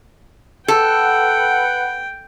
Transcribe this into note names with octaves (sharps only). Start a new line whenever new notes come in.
A4 B4 F#5 G5